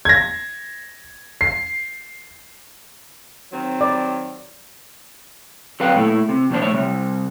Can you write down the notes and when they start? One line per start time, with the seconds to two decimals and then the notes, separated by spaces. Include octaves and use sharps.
0.05 G#6 A#6
1.41 C7
3.52 D#3 F#3 C4
3.81 D5
5.80 F#3 C4 A#4 B4 F5 G5
5.95 A#2 A3 E4
6.29 C3
6.50 F2 B2 D#3 D4 C5
6.62 A3 C#5 E5
6.73 C3 G3